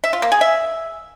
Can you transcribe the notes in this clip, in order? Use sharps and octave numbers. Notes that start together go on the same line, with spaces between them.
E5
F4
A#3
G#4
E5